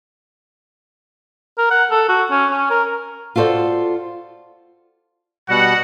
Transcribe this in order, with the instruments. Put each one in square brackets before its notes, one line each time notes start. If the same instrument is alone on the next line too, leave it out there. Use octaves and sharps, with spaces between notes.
[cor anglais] A#4
F#5
A4
F#4
C#4
C#4
A#4
[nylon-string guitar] F4 F#4 A4 C5 D5
[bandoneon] B2 G3 [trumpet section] F#4 F#5